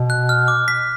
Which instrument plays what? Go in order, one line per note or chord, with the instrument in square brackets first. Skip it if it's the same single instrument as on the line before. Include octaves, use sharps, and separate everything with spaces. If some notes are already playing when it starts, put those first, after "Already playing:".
Already playing: [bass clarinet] B2
[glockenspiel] F#6
F6
D6
B6